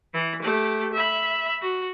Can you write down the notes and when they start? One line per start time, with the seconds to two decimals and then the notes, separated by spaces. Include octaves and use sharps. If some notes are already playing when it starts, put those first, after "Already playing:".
0.14 E3
0.43 A3 G4
0.93 E5 B5
1.62 F#4